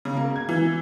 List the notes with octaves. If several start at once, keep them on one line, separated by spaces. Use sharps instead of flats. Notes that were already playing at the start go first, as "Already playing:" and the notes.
C#3
A#3
G#6
E3